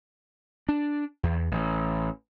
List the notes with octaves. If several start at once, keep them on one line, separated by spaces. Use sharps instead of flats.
D4
E2
A1